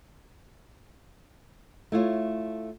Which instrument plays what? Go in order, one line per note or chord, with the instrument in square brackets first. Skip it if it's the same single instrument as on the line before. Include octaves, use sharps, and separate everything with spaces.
[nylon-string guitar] A3 E4 F4 C#5